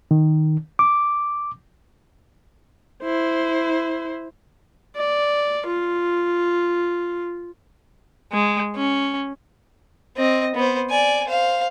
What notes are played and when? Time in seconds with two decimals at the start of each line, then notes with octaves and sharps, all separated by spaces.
0.11 D#3
0.79 D6
3.03 E4 C5
4.96 D5
5.67 F4
8.32 G#3
8.76 C#4
10.17 C4 D#5
10.55 B3 C5
10.90 D5 G#5
11.28 C5 F5